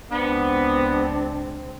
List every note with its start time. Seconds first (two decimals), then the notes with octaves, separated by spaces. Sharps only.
0.12 C#2 B3 C4 D4